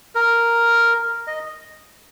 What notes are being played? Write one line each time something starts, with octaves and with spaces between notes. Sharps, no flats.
A#4
D#5